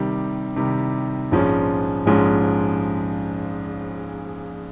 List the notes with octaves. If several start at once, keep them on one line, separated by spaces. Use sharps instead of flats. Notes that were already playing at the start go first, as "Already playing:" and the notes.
Already playing: C3 D#3 G3
C3 D#3 G3
A#1 G#2 F3 G#3 C#4
A#1 G#2 F3 G#3 C#4